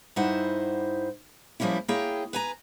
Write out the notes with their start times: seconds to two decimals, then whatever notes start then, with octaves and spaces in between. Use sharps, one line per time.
0.16 G2 D#4 E4 C5 F#5
1.60 F3 G3 A#3 C#4 E4
1.88 A#3 E4 G#4 C#5 G5
2.33 B4 G#5 A#5